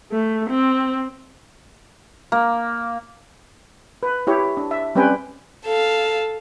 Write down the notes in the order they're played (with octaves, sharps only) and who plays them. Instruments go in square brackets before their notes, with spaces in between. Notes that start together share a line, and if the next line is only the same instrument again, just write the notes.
[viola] A3
C4
[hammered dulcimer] A#3
[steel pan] B4
E4 G4 C#5
D4
E5
G3 C4 C#4 B4 G5 G#5
[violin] A4 F5